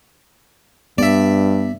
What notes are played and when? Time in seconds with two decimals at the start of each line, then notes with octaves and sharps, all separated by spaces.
0.98 G2 B3 D5 E5